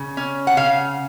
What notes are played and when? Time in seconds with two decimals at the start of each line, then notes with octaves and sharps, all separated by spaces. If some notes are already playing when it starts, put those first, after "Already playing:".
Already playing: C#3
0.17 C#4
0.47 F#5
0.57 C#3 F5